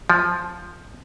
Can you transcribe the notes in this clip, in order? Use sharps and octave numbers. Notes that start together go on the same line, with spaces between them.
F3